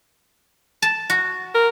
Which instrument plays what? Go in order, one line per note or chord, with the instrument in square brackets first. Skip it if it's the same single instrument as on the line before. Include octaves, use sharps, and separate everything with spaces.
[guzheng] A5
F#4
[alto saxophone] A#4